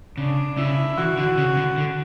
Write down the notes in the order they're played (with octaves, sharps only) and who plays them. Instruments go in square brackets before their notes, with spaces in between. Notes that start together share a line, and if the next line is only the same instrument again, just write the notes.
[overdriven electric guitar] C#3 [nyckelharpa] D4
[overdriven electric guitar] C#3 [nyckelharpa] E4
[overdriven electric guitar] E3 [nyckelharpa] F#4
[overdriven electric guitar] D3
C#3
D3
D3